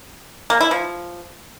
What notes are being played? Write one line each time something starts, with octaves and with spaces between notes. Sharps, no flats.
A#3
E4
F3